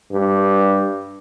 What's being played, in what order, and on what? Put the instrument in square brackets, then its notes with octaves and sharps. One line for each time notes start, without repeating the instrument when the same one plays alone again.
[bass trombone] G2